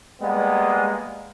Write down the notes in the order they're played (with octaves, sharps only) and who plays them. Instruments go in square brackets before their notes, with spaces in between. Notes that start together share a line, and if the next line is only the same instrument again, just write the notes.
[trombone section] G3 G#3 A#3 B3